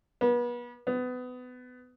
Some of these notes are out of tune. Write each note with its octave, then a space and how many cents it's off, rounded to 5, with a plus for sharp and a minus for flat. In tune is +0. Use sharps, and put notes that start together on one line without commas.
B3 -35
B3 +25